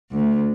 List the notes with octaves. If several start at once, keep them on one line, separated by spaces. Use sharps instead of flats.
D2